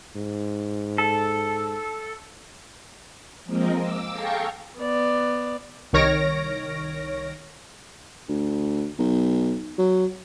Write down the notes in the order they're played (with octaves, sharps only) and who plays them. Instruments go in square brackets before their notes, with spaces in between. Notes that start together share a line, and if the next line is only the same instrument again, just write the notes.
[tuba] G#2
[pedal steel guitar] A4
[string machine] F3 G#3 A#3 C4 A#4 D#5
D6 E6
G#4 A4 F5 G5 A#5 C#6
[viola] B3 D5
[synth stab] C2 D#3 C#5 F6 A#6 D7
[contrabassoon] D2
B1
F#3